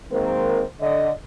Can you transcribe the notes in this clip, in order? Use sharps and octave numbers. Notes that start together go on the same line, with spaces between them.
D#3 G#3 A#3 C4 A#4 C5
D3 D5 D#5